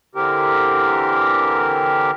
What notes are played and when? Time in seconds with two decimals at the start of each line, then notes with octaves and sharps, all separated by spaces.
0.15 D3 E3 C4 G4 A#4